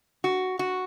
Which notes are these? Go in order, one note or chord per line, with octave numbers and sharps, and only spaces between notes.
F#4
F#4